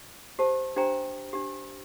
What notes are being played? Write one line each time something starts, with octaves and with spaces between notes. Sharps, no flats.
G4 C5 A5
D4 G4 C5 G5 A#5
D4 G4